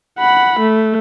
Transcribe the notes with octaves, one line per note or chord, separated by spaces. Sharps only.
F#5 B5
A3